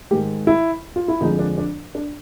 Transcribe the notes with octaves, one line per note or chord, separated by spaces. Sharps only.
G#2 D#3 G#3 G4
E4
F4
E4
F2 D3 F3 G#3 D#4
D4
D4
D4